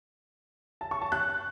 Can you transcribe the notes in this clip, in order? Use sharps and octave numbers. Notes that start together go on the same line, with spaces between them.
A5
C#6
A5
F#6